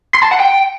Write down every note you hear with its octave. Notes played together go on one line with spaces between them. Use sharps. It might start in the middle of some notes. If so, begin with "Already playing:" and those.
C6
A5
F#5
G5